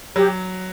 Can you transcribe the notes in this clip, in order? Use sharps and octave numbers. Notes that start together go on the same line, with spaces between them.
F#3 G4